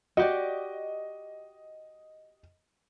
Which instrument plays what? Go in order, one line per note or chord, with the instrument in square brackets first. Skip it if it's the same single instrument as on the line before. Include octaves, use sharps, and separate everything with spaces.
[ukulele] F#4 G4 D5 [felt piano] D#5